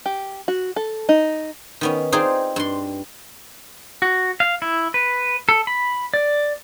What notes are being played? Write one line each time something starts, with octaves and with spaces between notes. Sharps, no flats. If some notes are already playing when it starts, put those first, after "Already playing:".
G4
F#4
A4
D#4
D#3 B3 C#4
C4 D#4 F4 G#4 C5 D5
G2 C6
F#4
F5
E4
B4
A4
B5
D5